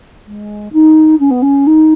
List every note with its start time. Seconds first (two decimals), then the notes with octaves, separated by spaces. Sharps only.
0.26 G#3
0.73 D#4
1.20 C#4
1.30 B3
1.42 C#4
1.67 D#4